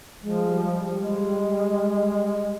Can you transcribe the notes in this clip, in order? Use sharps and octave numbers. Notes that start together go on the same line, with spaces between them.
F3 G#3
G3
G3
G#3